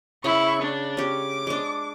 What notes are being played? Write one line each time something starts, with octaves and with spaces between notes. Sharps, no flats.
C#3 E4 C#6
D4
C#4 G4 D6
G#3 D4